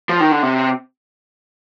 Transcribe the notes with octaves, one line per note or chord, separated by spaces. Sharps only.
F3
D#3
D3
C3